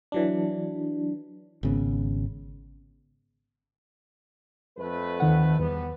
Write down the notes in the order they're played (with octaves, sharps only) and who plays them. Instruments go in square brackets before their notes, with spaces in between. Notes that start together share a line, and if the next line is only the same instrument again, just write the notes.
[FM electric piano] E3 F#3 D4
[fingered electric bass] G#1 C#3 B3
[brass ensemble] F2 A3 B4
[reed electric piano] D#2 D#3 F#5
[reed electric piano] E2 [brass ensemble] G3 B3